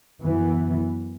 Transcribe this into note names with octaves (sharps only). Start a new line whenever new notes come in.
F#2 E3 B3